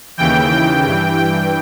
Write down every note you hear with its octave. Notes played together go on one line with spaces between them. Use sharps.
D#2 C#3 E3 G5
G5
G2 E3
G5